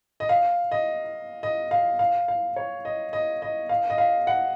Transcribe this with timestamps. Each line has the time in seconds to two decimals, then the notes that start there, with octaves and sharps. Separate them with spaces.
0.20 D#5
0.29 F5
0.72 D#5
1.43 D#5
1.71 F5
1.99 F5
2.28 F5
2.56 C#5
2.85 D#5
3.13 D#5
3.42 D#5
3.69 F5
3.90 D#5
3.98 F5
4.27 F#5